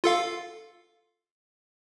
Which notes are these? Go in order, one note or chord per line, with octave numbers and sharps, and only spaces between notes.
F4 A4 F5